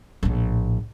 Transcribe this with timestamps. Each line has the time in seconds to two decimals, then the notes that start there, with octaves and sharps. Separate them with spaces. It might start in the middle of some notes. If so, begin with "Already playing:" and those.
0.23 A#1 A2